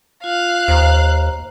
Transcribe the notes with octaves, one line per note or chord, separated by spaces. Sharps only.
F4 F5 F#6
D#2 C5 A#5